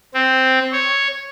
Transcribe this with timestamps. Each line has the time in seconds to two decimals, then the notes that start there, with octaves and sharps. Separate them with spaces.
0.14 C4
0.72 C#5